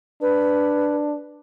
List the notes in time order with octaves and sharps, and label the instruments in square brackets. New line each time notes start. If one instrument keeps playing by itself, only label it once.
[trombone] D4 [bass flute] B4